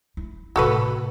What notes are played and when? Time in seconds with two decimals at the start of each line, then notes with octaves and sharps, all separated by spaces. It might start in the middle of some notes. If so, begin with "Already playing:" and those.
0.17 E4
0.56 A2 C3 F#4 A4 B4